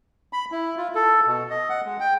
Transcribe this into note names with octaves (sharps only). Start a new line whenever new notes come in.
B5
E4
F4
A4
B2
D#5
F#5
G#3
G5